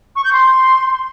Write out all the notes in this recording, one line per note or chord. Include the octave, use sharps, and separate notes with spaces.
C#6
G6
C6